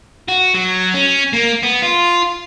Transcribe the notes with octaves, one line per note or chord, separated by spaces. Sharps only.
F#4
F#3
C#4
A#3
B3
F4